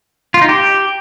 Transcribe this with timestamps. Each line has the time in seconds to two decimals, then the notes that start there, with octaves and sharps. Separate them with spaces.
0.34 F4
0.41 D#4
0.49 G4